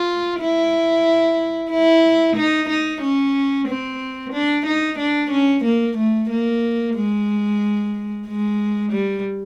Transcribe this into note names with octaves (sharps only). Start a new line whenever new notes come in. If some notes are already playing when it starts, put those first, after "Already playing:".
Already playing: F4
E4
E4
D#4
D#4
C#4
C4
D4
D#4
D4
C#4
A#3
A3
A#3
G#3
G#3
G3